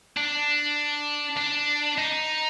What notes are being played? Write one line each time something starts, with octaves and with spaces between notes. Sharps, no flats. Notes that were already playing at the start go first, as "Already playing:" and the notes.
D4
D4
D#4